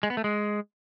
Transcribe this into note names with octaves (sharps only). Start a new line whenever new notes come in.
G#3
B3
A3
G#3